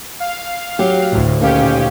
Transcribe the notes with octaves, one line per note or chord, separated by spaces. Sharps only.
F5
F#3 G4
D2 A2
A#2 D#3 C#4 G4 F5